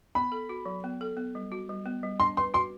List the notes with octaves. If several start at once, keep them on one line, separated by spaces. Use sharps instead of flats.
B3 B5
A4
F#4
F#3
B3
A4
B3
G3
F#4
G3
B3
G3
D4 C6
B4 C6
F#4 C6